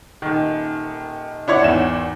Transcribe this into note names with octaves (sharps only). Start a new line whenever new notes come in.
D#1 D#3
D4 E4 C#5 D5 F#5
G#1 E2 E7